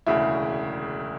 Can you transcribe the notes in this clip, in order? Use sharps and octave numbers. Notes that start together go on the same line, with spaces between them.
E1 D2 C#3 E4